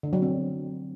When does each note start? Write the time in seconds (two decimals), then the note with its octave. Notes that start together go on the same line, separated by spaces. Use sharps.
0.03 D3
0.13 F#3
0.22 C4